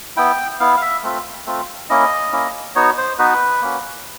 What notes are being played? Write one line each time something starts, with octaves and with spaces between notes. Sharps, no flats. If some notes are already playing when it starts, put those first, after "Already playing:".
B3 E4 G5
B3 E4 F5
F5
E5
A3 C4 F4
A3 C4 F4
A#3 C#4 E4 D#5
A#3 C#4 E4
B3 D#4 F#4 C#5
C5
B3 D#4 F#4 B4
A#3 C#4 F#4